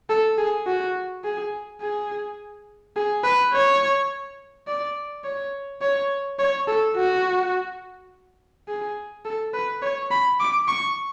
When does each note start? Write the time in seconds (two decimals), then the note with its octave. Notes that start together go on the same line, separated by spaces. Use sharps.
0.10 A4
0.38 G#4
0.67 F#4
1.24 G#4
1.81 G#4
2.96 G#4
3.24 B4
3.53 C#5
4.67 D5
5.24 C#5
5.82 C#5
6.39 C#5
6.68 A4
6.96 F#4
8.68 G#4
9.25 A4
9.54 B4
9.82 C#5
10.10 B5
10.40 D6
10.68 C#6